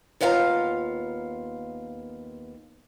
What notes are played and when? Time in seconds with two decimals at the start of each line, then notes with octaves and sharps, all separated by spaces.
0.21 D#2 B3 F4 F5 G#5 A#5